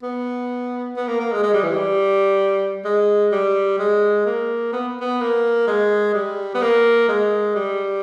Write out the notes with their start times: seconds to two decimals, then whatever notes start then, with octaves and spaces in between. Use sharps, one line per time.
0.03 B3
0.97 B3
1.08 A#3
1.20 A#3
1.32 G#3
1.43 G#3
1.53 G3
1.63 E3
1.73 G3
2.84 G#3
3.32 G3
3.79 G#3
4.26 A#3
4.73 B3
5.01 B3
5.21 A#3
5.67 G#3
6.14 G3
6.55 B3
6.62 A#3
7.08 G#3
7.55 G3